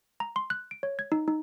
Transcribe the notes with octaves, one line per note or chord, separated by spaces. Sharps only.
A#5
C6
F#6
D7
C#5
G#6
D#4
D#4